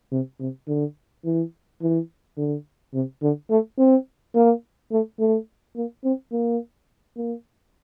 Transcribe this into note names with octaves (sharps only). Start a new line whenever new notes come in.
C3
C3
D3
E3
E3
D3
C3
D3
A3
C4
A#3
A3
A3
A#3
C4
A#3
A#3